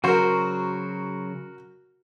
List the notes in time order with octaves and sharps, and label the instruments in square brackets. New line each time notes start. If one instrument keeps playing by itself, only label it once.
[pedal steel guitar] C#3 F#3 C5 [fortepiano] F#4 A#4